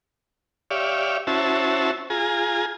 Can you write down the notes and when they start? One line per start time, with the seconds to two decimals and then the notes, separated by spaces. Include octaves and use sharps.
0.71 G4 C#5 D5 E5 F5
1.27 C#4 E4 F#4 C5 E5 A5
2.10 F4 G#4 G#5 A#5